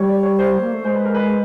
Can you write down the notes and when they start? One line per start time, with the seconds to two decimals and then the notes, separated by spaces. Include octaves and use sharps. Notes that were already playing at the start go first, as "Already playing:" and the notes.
Already playing: G3 C#5
0.09 D5
0.23 C#5
0.39 C5
0.60 A#3
0.72 A3
0.84 G#3 C5
0.95 B4
1.05 A#4
1.15 B4